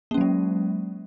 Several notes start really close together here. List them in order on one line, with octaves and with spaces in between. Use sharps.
A#3 C#4 F#3 G#3